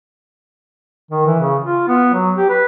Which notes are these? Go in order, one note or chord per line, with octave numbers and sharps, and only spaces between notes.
D#3
E3
C#3
F4
B3
F#3
G4
B4